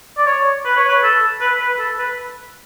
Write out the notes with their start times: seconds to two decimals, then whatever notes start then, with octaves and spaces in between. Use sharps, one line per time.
0.18 D5
0.26 C#5
0.65 B4
0.77 C#5
0.89 B4
1.03 A4
1.41 B4
1.60 B4
1.79 A4
1.98 B4